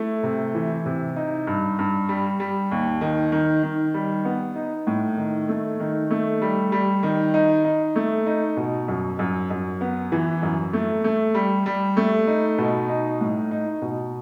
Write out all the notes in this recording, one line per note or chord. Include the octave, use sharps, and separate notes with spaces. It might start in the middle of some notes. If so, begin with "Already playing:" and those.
Already playing: A3 E4
C3
E3
C3
D#4
G2
G2
G3
G3
D#2
D#3
D#3
D#3
G3
B3
D#4
A2
D#3
A3
D#3
A3
G3
G3
D#3
D#4
D#4
A3
D#4
B2
F#2
F#2
F#2
B3
E3
F#2
A3
A3
G3
G3
A3
D#4
B2
D#4
A2
D#4
B2